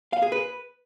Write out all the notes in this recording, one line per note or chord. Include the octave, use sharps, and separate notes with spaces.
F5
G#4
B4